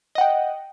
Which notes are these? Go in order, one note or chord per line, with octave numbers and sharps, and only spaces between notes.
D#5 F#5 G5